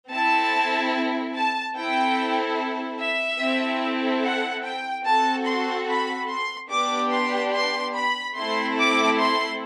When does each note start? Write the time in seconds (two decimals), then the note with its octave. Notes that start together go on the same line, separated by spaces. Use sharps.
0.11 C4 E4 A4 A5
1.34 A5
1.76 C4 E4 A4 G5
2.99 E5
3.40 C4 E4 A4
4.23 F#5
4.64 G5
5.05 C4 F#4 A4 A5
5.47 C6
5.88 B5
6.30 C6
6.70 B3 D4 G4 D6
7.12 C6
7.53 C6
7.95 B5
8.36 A3 C4 E4 A4 C6
8.77 D6
9.18 C6